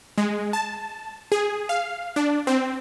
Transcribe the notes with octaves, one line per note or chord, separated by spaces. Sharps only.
G#3
A5
G#4
F5
D4
C4